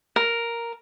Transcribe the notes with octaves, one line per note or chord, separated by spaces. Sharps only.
A#4